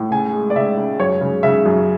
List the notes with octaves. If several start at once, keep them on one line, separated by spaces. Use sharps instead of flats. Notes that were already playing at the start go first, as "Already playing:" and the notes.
Already playing: A2
C#3 G#5
G#3
D5
C#3 E5
C#3
F#2 C#5
C#3
C#3 E5
F#2